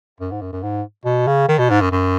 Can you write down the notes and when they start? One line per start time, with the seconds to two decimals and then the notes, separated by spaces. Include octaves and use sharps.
0.20 F#2
0.31 G#2
0.42 F#2
0.52 F#2
0.63 G#2
1.05 B2
1.27 C#3
1.48 D#3
1.59 B2
1.70 G#2
1.81 F#2
1.91 F#2